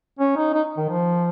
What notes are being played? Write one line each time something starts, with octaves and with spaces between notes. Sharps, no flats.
C#4
D#4
D#4
D#3
F3